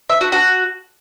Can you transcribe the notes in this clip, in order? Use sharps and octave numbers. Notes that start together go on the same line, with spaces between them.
E5
F#4
F#4